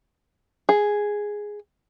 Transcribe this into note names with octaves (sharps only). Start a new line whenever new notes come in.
G#4